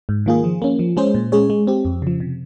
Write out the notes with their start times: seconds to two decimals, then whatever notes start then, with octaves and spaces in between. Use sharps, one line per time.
0.09 G#2
0.26 D#3 A#3 F4 G#4
0.44 F3
0.62 A#3 C#4
0.79 F3
0.97 G#3 C#4 G#4 C5
1.14 A#2
1.32 G#3 C#4 G#4 C#5
1.50 G#3
1.67 C4 G4
1.85 F2
2.02 C#3 F3
2.20 C3